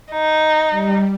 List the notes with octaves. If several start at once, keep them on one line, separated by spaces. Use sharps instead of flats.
D#4
G3